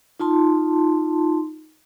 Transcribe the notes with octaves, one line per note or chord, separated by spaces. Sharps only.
D#4 F4 A5 C6